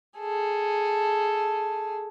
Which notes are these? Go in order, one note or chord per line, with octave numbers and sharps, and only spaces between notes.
G#4 A4